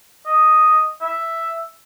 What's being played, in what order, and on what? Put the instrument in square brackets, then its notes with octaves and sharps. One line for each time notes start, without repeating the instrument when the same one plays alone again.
[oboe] D#5
E5